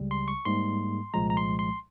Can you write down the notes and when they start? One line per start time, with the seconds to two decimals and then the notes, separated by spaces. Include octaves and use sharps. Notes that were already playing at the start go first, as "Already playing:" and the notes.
Already playing: C#2 C#3 G3
0.11 C6
0.28 C#6
0.45 G#2 G3 A#3 C6
1.14 C2 A#2 F3 G#3 A#5
1.30 A#5
1.37 C6
1.59 C6